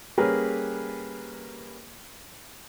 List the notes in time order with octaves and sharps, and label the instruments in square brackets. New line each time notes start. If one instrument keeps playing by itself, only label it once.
[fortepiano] G3 A#3 C#4 G#4 A#4 B4